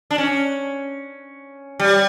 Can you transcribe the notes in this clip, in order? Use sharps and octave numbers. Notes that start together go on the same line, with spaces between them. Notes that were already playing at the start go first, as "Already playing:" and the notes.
D4
C#4
G3